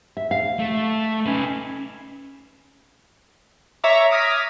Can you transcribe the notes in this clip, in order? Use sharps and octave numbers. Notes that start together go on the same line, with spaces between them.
E5
F5
A3
C#4 D#4 B4
C#5 E5 A#5 D6
D6 D#6 F6 G#6 A#6 B6